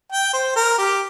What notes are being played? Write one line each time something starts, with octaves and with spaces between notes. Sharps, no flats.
G5
C5
A#4
G4